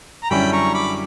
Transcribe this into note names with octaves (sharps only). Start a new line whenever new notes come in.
A#5
F#2 D3 G3 C#4 E4 G5 B5
A#5 C#6
B5 D6